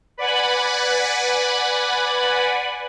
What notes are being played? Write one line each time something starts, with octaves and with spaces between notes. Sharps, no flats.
B4 D5 F#5 G#5 B5